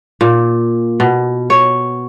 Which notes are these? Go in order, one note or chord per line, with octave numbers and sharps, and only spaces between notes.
A#2
B2
C#5